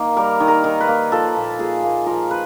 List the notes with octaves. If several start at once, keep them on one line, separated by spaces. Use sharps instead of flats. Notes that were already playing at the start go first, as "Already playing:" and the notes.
Already playing: D#3 A#3
G3 A#4
D#3
A#4
D#3
B4
A#3
F3 A4
A#2
A#2 G#4
A#3
F3 A#4
B4